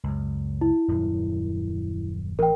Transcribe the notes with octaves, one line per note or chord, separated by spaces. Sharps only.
C#2 F#2
E4
D#1 F#2
A1 E3 A#4 G5